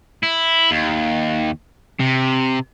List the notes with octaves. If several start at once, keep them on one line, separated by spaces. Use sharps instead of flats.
E4
D#2
C3